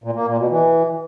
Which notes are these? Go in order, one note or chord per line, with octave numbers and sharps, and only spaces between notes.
A#2
A#3
A#2
B2
E3